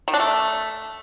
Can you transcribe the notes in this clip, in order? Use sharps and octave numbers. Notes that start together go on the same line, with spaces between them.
D#3
D4
A3